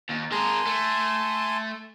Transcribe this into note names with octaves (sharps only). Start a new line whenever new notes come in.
D#2
G#3 A#4 G#5 A5 C6
A3